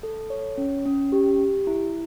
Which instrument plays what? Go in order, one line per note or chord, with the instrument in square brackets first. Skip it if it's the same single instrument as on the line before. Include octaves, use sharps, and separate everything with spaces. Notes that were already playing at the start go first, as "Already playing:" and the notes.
[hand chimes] A4
C#5
C#4
C#4
G4
G4
E4